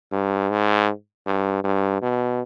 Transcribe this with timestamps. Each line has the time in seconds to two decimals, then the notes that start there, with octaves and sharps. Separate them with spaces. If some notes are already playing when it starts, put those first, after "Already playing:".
0.12 G2
0.51 G#2
1.26 G2
1.64 G2
2.02 B2